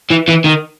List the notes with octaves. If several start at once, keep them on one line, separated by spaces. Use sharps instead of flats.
E3
E3
D#3